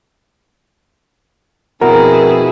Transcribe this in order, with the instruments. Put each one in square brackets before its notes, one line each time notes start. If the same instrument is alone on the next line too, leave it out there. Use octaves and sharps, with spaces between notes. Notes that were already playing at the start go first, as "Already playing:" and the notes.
[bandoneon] F2 B3 [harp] B2 [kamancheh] E4 G#4 [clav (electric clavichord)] A#4